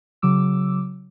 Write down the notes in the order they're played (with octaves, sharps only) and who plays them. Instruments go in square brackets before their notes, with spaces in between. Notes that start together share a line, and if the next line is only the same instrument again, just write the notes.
[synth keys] C#3 F#3 D6 E6